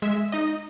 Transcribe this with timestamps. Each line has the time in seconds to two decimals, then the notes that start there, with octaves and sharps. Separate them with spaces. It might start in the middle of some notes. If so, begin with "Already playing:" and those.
0.02 G#3 E5
0.32 D#4 D#5